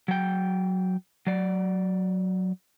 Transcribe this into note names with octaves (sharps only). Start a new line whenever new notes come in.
F#3 G5
F#3 D5